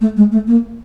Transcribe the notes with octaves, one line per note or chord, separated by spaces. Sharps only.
A3
G#3
A3
A#3